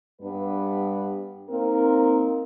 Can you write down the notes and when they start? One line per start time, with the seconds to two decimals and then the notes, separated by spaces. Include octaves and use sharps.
0.22 G2 G3 B3 D4 B4
1.49 A#3 C4 D#4 A#4